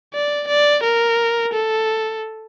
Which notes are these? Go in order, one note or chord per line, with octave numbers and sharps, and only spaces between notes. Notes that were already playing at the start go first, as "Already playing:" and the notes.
D5
D5
A#4
A4